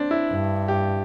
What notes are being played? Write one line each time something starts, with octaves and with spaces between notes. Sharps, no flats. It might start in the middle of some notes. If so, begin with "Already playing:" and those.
Already playing: C4 D4
E4
G2
G4